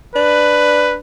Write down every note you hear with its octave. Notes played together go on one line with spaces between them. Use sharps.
D4 B4